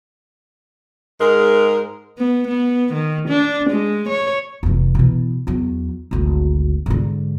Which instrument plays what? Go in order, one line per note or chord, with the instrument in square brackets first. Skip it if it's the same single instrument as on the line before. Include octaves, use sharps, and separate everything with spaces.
[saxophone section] G#2 G#3 A#4
[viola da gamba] B3
B3
D#3
D4
G#3
C#5
[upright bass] F1 E3
B2 E3
E2 F#3
G#1 D2
G#2 D3